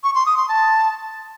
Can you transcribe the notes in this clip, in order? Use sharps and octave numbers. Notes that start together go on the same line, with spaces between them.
C#6
C6
D#6
C6
A5